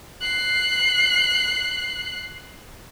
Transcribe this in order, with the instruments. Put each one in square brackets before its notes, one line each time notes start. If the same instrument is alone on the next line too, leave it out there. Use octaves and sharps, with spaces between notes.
[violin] F#6 C7